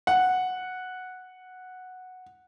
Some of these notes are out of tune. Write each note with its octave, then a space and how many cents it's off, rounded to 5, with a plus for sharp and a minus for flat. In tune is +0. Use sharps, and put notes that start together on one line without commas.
F#5 -5